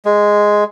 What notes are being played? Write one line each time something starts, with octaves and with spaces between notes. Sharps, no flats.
G#3